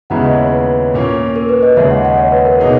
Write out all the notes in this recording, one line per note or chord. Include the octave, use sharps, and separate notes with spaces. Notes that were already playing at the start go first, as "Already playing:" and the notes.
D#2 C#3 G#3 B3 E4 F#5 A#5
B4 D#5
C#5
B4
A#2 A#3 C#4 A#4
A#4
B4
B4 D#5
D#2 C#3 G#3 C#5 E5
D#5 F#5
D#5 F#5
C#5
B4
A#4
B2 A#3 D#4 G#4